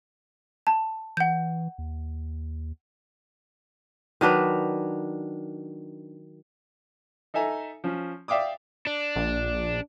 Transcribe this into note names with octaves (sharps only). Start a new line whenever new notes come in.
A5
E3 F#5 G6
D#2
D#3 F#3 D4 B4
D#4 A4 E5 G#5 A#5
F3 C#4
D5 E5 F5 G5 D6 D#6
D4
A#1